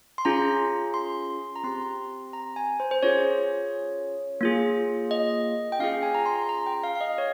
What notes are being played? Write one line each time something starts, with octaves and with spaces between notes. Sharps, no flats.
C6
C#4 F4 G#4 A#5
C6
A#5
C4 G4 C6
A#5
G#5
C5
C5
C#4 F4 G#4 C#5
A#3 F4 G#4
D#5
G5
C#4 F4 G#4 F5
G#5
A#5
C6
A#5
G5
F5
F5
D#5
C#5